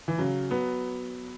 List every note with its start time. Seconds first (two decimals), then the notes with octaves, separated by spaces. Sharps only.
0.08 E3
0.18 C#3 F#3
0.51 F#3 B3